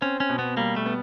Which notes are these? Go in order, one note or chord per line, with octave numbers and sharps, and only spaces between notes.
C4 C#4
C#4
B2
B3
G3 A#3
A3
B3